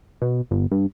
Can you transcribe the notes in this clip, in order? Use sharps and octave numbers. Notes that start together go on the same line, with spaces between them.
B2
G1
G2